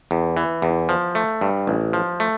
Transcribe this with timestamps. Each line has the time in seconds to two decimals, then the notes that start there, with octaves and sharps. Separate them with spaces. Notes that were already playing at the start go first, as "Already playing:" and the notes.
0.11 E2
0.37 E3
0.62 E2
0.89 F3
1.15 A3
1.41 G2
1.67 A1
1.93 F3
2.20 A3